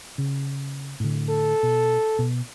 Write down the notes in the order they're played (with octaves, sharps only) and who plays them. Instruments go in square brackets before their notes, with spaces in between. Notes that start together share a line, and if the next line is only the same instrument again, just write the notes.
[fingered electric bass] C#3
A2 D3
[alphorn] A4
[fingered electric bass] B2
B2